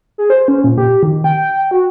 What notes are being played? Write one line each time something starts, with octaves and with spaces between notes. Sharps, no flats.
G#4
C5
C#4
A#2
G4
D#3
G5
F#4